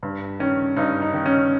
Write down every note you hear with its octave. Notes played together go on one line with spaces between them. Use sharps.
G2
D#3 C#4
G2 D#4
D#4
D#3
C#4